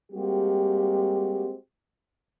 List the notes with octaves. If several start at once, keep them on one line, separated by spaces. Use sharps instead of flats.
G3 G#3 A#3 C4 F#4 G4